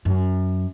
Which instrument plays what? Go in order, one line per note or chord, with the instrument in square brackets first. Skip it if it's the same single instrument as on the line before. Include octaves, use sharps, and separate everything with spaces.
[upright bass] F#2